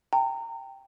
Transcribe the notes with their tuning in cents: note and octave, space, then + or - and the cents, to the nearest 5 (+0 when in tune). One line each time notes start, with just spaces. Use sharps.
G5 +0 A#5 -30